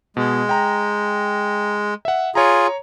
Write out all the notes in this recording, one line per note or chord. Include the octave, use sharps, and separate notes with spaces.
B2 G#3
G5 A#5
E5 F#5
F4 G#4 C#5 A#5